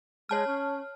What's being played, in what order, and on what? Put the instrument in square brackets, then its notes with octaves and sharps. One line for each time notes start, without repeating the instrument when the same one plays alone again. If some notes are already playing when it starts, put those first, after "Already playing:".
[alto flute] G#3 [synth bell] C#5 A5 F6
[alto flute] C#4